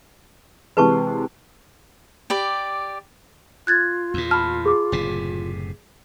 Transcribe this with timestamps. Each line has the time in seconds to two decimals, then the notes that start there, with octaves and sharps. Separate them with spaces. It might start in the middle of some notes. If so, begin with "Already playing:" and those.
0.77 C3 E3 G#3 B4 A5 C#6
2.30 G4 D5 B5
3.67 F4 F#6 G#6 A6
4.14 E2 A#2
4.31 A5 B5 F6
4.66 G#4 D6
4.92 F#1 A2 C3